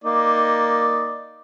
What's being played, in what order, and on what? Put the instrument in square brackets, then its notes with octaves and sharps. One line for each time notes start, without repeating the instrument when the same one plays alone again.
[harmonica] A#3 D#4 D5